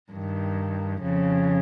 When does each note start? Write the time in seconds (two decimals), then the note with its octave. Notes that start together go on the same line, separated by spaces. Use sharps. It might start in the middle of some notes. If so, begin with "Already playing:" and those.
0.12 G2 D#3
1.02 F2 C#3